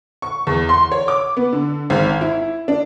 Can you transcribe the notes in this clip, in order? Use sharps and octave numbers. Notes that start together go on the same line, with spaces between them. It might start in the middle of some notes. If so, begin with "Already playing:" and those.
C#6
E2
C6
C#5
D6
B3
D3
G#1
E4
D4